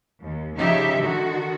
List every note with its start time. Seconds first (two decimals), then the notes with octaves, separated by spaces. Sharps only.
0.20 D#2
0.57 C#3 F3 D#4 G4 E5
0.98 D3 D#3 F#4